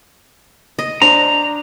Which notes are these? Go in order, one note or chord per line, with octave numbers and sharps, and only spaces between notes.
D#5
D4 C5 A#5